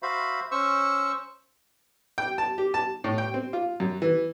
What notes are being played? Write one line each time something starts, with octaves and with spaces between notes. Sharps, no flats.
F#4 C5 E5 F5 B5
C#4 C5 C#6 E6
G5
A5
G4
A5
A2
G5
C4
F4
F#2
E3